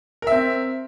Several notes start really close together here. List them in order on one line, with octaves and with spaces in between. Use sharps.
A#4 E5 C4